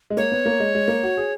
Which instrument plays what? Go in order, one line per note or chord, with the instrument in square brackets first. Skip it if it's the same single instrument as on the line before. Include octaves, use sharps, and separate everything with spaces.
[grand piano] G#3
[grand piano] A#3 [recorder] C#5
[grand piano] B3
A#3
G#3
G#3
A#3
F#4
G#4